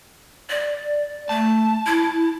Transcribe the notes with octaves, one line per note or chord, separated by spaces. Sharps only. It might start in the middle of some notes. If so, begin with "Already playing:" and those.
D5
A3 A5
E4